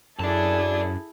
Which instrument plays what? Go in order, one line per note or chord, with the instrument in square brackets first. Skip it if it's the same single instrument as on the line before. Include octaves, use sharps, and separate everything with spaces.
[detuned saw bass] F#2 [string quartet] E4 G#4 A4 [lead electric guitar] D5 A5